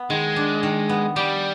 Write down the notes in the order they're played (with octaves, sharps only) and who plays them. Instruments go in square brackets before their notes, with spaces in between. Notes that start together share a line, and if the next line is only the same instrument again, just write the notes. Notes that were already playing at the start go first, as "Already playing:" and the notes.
Already playing: [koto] B3
[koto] D#3 [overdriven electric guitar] G#3
[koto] D4
D#3
B3
[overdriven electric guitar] G3 [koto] G4